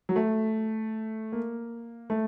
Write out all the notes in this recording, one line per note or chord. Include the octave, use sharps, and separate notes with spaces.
F#3
A3
A#3
A3